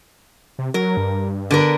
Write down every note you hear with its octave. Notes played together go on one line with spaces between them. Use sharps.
C3
F#3 A#4
G2
D3 B3 A#4